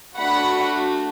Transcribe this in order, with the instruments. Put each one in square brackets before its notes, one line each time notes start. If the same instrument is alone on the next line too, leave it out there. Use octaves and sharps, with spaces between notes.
[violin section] A3 D4 F#4 F#5 B5